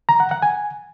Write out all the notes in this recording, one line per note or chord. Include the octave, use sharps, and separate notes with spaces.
A#5
F#5
F#5
G#5